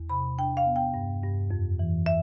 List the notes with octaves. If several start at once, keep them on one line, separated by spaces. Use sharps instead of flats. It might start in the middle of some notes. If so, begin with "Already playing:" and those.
Already playing: E2
C3 B5
D4 G5
F5
B3
G5
G2
G2
F2
E3
E5